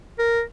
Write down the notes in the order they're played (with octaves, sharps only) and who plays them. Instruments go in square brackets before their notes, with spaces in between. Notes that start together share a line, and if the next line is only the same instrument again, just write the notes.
[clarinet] A#4